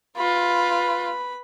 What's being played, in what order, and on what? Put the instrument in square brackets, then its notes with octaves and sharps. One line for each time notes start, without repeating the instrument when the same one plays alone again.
[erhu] F4 [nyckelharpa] B4 B5